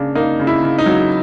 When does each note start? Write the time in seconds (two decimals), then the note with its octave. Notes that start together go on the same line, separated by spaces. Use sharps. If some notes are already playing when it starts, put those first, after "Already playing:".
Already playing: C#3 A#3 D4
0.15 A#3 D#4
0.40 C#3
0.47 E4
0.62 C#3
0.78 D#4
0.86 F#3